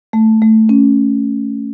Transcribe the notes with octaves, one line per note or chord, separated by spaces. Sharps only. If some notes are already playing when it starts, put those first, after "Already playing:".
A3
A3
C#4